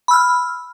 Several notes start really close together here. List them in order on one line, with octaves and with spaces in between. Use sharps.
B5 E6 F6